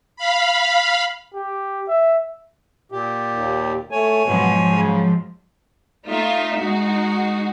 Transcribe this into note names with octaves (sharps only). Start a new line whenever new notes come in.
F5 B5
G4
E5
A#2 G4
D#2
A3 C#5 G#5
G#2 B2 F3 F#3
C#3
A3 D#4 F4 E5
G#3 D#4 F#4